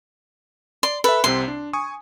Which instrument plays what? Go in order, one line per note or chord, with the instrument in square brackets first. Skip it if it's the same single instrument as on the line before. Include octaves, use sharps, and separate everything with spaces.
[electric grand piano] D5 [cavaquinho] C6
[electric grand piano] A4 E5 [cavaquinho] B4
[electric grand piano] C2 C3 C4 [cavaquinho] C6
[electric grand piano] D4
G#5 C#6 D#6